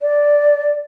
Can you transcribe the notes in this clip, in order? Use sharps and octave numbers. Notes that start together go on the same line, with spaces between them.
D5